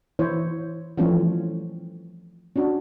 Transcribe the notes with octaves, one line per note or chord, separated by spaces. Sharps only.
E3 E4 C5 C#5
E3 F3 G3 A3 C4 C#4
C#4 D4 F#4